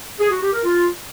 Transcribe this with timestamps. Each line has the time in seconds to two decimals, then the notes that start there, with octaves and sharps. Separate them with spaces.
0.20 G#4
0.31 F#4
0.42 G4
0.53 A#4
0.64 F4